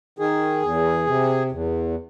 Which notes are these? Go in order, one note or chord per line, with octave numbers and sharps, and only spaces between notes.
D#3 G#4
E2
C3
E2